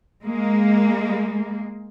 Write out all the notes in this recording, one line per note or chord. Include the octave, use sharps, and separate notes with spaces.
G#3 A#3